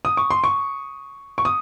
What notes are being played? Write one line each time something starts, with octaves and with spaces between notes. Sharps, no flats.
D#6
C#6
C6
C#6
C#6
D#6